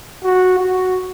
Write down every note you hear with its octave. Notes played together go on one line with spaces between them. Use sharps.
F#4
F#4